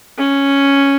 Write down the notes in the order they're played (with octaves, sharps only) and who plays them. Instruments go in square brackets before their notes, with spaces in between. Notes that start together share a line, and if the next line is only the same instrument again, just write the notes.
[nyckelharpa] C#4